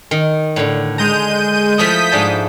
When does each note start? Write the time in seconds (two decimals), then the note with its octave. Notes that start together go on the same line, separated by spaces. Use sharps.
0.11 D#3
0.56 A2 D3
0.98 G#3 A#5 G6 D#7
1.78 F3 A3 E4 D#6 G6 B6
2.12 G#2 D4 A5